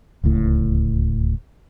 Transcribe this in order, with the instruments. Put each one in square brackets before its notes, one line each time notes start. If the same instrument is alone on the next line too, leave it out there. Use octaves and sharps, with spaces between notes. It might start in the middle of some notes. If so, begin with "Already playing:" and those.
[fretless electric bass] D1 C#2 A2